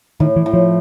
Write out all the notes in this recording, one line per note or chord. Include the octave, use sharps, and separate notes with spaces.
A2 D#3
E3
A2
F3